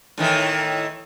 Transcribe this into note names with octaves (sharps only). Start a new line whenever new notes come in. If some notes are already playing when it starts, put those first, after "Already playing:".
A2 D#3 E3